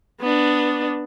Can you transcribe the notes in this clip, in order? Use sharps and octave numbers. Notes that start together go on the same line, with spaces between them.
B3 D4